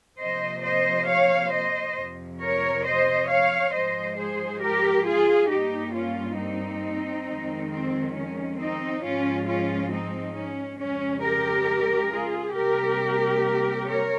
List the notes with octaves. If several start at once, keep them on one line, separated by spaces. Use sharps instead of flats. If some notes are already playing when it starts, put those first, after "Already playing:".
C3 F3 A#3 C5 D#5
C5 D#5
C#5 F5
C5 D#5
F2 C3 F3
A#4 C#5
C5 D#5
C#5 F5
G#2 F3 G#3 C5 D#5
G#4 C5
G4 A#4
F4 G#4
G2 G3 A#3 D#4 G4
C#4 F4
C4 D#4
F2 D#3 G#3
C4
C#4
C4 D#4
G#2 F3 G#3 C#4 F4
C#4 F4
C4 D#4
C#4
F2 C#3 G#3 C#4
G4 A#4
F4 G#4
C3 G3 A#3 G4 A#4
A#4 C#5